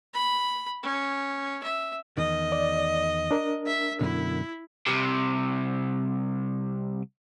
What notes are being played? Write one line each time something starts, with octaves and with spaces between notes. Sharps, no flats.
B5
C#4
E5
E2 D#3 D#5
D5
D4 A#4
E5
F#2 B2 D3 E4
C2 C3